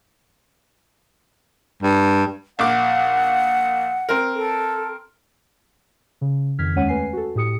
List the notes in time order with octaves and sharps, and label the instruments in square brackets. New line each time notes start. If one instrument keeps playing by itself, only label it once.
[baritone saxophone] G2
[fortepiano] A#1 D6 [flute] F#5
[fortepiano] C4 A#4
[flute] A4
[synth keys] C#3
F2 D#3 F6 G#6 B6
D#2 G#3 C#4 C#5 F#5 D#7
A3 B4 G#5 C7
F#4 A4
A2 G4 D#6 C#7